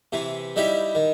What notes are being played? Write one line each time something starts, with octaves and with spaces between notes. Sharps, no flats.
C3 E3 C4
G3 D#4 E4 G4
D#3